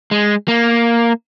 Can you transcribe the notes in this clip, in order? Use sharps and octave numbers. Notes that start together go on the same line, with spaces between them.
G#3
A#3